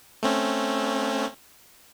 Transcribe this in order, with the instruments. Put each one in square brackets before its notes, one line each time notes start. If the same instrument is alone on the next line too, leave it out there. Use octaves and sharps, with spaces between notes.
[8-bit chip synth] A3 C4 C#4